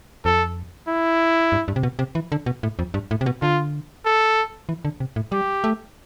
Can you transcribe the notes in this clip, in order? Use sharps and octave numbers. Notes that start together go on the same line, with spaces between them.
F2 A4
E4
G2
G2
C3
B2
C3
E3
D3
B2
A2
F2
G2
A2
C3
B2
D3 F4
A4
E3
D3
C3
A2
G3 G4
A3